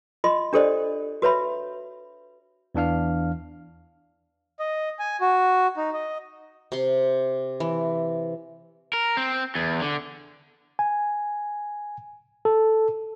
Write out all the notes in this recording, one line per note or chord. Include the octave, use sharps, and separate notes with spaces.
F4 D#5 C6
D4 G4 A4 C5 D5 D#5
F#4 B4 C#5 E5 B5
E2 E3 D4 F5 F6
D#5
G#5
F#4
D#4
D#5
C3 C6
E3
A#4
C4
E2
D3
G#5
A4